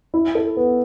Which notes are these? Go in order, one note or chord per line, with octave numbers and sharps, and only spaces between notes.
E4
A4
B3